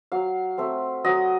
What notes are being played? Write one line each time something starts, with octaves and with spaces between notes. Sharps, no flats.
F#3 F5
A3 C4
F#3 D#5